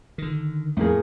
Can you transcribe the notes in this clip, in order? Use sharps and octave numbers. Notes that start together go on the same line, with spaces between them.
D3 D#3
F2 A2 A#3 G#4